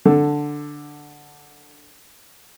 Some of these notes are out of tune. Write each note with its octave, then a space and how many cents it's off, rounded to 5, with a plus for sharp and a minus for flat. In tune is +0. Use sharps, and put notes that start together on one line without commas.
D3 +0 A4 +0